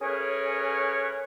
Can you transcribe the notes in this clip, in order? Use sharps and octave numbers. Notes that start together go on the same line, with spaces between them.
A3 C#4 G#4 A#4 B4 C#5